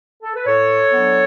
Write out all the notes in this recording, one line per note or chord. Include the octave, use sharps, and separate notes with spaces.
A4
B4
A2 A4 C#5
F#3 B3 D4